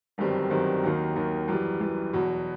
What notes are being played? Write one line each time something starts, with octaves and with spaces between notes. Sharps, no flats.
G1 F#2 D#3 G3 C4
G1 F#2 D#3 G3 C4
D#2 D#3 F#3
D#2 D#3 F#3
F#2 E3 G3
F#2 E3 G3
E2 B2 F#3